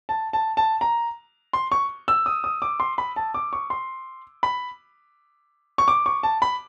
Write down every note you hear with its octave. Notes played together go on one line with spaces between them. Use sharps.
A5
A5
A5
A#5
C6
C#6
E6
D#6
D#6
D6
C6
B5
A5
D6
C#6
C6
B5
C#6
D6
C#6
A5
B5